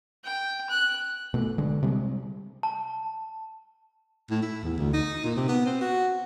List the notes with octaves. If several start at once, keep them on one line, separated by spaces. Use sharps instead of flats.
G5
F#6
B2 A3
D3 G#3
C3 G3 G#3
A5
A2
E4
E2
D2
D#4
A#2
C3
B3
C4
F#4